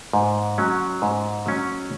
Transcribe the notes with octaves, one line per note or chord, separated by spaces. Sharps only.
G#2
F#3 C#4
G#2
F#3 C#4